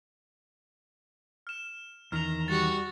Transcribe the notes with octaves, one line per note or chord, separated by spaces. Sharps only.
F6 E7
E2 D#3 A#5 F6 F7
G3 F#4 C#6 A6